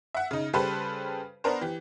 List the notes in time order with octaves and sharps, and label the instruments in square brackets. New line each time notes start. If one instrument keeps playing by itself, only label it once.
[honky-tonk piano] E5 F#5
C#3 D#4
C#3 G3 G4 A4 B4 C5
B3 D4 A#4 C5
E3 G4